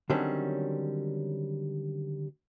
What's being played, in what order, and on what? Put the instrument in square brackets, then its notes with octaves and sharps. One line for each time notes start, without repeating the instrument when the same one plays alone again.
[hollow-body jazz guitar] D3 D#3 F#3 G3 C4 C#4